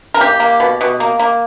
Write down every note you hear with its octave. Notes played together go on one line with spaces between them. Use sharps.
A#4
A#3 G4
A#3
B2
B2
A#3
A#3